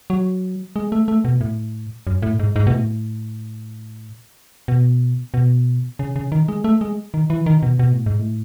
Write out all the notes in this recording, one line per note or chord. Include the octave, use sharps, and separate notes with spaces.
F#3
G#3
A3
A3
B2
A2
F#2
A2
G#2
G#2
B2
A2
B2
B2
C#3
C#3
D#3
G#3
A3
G#3
D#3
E3
D#3
B2
B2
A2
G#2
A2